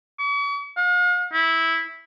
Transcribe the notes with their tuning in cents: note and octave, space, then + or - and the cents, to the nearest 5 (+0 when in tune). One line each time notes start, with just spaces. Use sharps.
C#6 +45
F5 +45
E4 -10